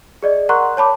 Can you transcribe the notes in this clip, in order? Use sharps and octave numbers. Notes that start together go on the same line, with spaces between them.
G#4 D5 D#5
A#4 F#5 A#5 C6 C#6 F#6
C#5 A5 B5 D6